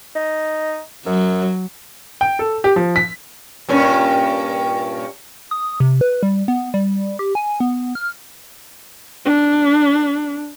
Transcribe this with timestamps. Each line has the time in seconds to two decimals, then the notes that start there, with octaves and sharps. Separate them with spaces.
0.15 D#4
1.06 F#2 F#3
2.21 G5
2.39 A4
2.64 G4
2.76 F3
2.96 B6
3.69 G2 A#2 C#4
5.51 D#6
5.80 C3
6.01 B4
6.23 G3
6.48 B3
6.74 G3
7.19 G4
7.35 G#5
7.60 B3
7.95 F6
9.25 D4